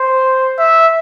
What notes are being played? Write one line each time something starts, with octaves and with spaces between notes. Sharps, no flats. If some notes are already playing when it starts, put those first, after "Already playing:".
Already playing: C5
E5